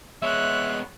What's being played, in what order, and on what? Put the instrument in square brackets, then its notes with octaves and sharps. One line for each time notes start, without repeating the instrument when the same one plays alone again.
[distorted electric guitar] G#3 B3 [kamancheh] C#5 F#6 [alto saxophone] E5